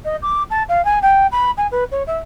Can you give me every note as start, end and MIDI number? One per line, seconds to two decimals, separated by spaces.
0.05 0.16 75
0.22 0.43 86
0.50 0.63 81
0.69 0.84 77
0.85 0.99 80
1.02 1.27 79
1.32 1.51 83
1.57 1.67 80
1.71 1.84 71
1.91 2.03 73
2.07 2.18 76